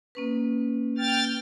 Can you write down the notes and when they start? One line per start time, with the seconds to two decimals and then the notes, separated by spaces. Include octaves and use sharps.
0.15 A#3 C#4 B4
0.98 G5 F6 A6